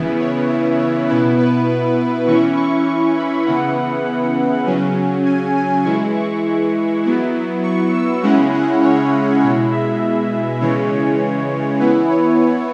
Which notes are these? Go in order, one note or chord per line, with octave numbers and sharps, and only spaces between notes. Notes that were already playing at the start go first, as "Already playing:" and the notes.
Already playing: C#3 E3 B3 E4
C#5
E5
C#5
B2 B3 E4 B4
B4
E3 C#4 E4 C#6
C#6
C#6
B5
C#3 E3 B3 E4 F#5
C#3 F#3 C#4
G#5
G#5
E3 G#3 E4 C#6
C#6
F#3 B3 E4
C#6
E6
C#3 G#3 C#4 E4 F#5
F#5
C#5
B2 G#3 E4 C#5
E5
C#3 E3 G#3 C#5
E3 B3 E4 B4
C#5
C#5